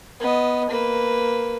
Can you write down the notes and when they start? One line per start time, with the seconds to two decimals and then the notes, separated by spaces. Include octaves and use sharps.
0.20 B3 D#5
0.69 A#3 B4